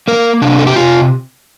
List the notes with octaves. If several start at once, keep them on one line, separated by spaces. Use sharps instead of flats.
A#3 A#4
C3 D4
A4
G4
C3 F4